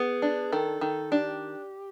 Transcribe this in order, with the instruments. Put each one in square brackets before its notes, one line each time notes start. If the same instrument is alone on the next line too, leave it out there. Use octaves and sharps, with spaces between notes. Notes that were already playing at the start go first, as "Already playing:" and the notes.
Already playing: [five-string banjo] B3 [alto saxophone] G#4
[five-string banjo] D4
[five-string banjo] D#3 [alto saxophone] A4
[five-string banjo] D#3 [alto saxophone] A4
[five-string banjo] D4 [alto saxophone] G4